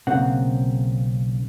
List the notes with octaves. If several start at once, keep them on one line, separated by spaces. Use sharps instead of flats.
B1 C#3 A#3 C4 F#5